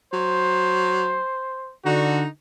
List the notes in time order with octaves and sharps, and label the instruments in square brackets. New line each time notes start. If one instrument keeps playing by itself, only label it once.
[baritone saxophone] F#3 [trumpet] C5
[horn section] D3 F#4 [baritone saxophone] D#4